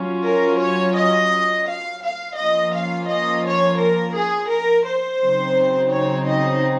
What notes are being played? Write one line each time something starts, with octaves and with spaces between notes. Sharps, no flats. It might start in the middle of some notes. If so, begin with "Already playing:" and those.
Already playing: F#3 C#4 F4
A#4
C#5
D#5
F5
F5
F3 A#3 C#4 F4 D#5
F5
D#5
C#5
A#4
G#4
A#4
C5
C#3 F#3 C4 D#4
C#5
D#5